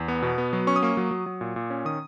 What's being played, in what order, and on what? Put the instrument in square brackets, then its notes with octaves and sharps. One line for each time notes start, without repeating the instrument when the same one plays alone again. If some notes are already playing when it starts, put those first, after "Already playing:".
Already playing: [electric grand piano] E2
B3
B2
B3
F#3
C#4 C#6
D#6
A#3 C#6
F#3
F#3
F#3
A#2
A#2
C#4
D#3 D#6